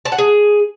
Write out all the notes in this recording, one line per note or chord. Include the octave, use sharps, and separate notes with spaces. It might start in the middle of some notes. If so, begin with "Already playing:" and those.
A5
F#5
G#4